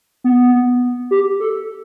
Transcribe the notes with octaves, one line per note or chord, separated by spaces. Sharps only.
B3
G4
A4